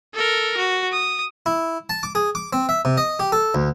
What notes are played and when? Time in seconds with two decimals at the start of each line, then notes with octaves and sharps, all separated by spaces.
0.15 A4 A#4
0.57 F#4
0.92 D#6
1.46 E4
1.90 A5
2.03 D6
2.15 G#4
2.35 D6
2.53 C4
2.69 E5
2.85 C3
2.97 D#5
3.20 G4
3.32 A4
3.55 D2